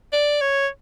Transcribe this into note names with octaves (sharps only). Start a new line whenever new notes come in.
D5
C#5